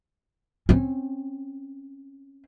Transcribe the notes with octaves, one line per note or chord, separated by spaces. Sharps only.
C4 C#4